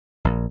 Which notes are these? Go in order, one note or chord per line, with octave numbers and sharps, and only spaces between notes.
A#1